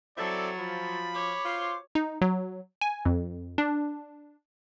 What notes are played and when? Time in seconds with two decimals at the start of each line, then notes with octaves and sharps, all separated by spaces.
0.17 F#3 C4 E4 A4 D5 A6
0.58 F3 B5
1.14 C#5 D6
1.45 F4 C5 C6
1.95 D#4
2.21 F#3
2.81 G#5
3.05 F2
3.58 D4